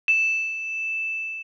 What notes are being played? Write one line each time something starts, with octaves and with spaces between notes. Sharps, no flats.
E7